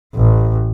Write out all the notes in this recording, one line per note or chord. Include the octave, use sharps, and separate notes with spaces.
A1